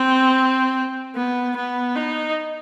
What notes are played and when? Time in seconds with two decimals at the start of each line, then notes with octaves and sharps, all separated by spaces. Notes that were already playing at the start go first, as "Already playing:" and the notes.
Already playing: C4
1.15 B3
1.56 B3
1.96 D#4